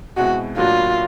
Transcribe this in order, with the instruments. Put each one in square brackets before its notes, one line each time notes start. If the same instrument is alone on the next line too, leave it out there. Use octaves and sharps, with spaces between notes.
[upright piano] B2 G#3 C4 E4 [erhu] F#4
[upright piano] A2 F#3 A#3 D4 F#4 [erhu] F4